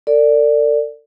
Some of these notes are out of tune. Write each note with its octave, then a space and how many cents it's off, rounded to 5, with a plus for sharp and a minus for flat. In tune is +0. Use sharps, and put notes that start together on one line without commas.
A4 +45 D5 +0